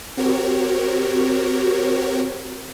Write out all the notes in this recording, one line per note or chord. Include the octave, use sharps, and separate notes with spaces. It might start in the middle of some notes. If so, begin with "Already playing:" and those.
C4 F#4 G4 A#4 C#5